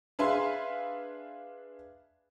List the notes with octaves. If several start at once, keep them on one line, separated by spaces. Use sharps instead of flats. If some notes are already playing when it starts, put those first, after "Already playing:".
D4 G#4 B4 E5 F5 C6